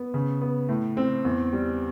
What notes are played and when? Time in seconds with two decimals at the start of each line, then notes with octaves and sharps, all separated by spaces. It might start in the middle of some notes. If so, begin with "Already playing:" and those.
Already playing: B3
0.14 C#3
0.42 B3
0.69 A2
0.97 C4
1.25 E2
1.53 G3